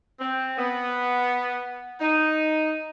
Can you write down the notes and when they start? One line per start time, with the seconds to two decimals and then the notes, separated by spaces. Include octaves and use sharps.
0.20 C4
0.57 B3
2.00 D#4